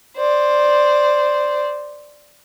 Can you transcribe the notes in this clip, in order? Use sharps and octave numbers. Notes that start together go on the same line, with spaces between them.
C5 D5